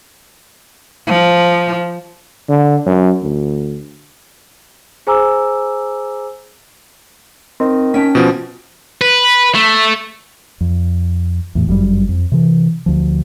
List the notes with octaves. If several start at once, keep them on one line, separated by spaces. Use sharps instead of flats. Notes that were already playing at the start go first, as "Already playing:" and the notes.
F3
D3
F#2
D2
G#4 C5 G#5 A#5 D6 E6
D#3 C4
C#4 G5 A5 B6
B2 F3 D7
B4
A3
F2
E2 A2
G1 F#2 C#3 G3
F2
C3 E3
D2 F3